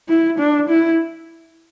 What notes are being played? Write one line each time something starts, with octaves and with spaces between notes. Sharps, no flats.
E4
D4
E4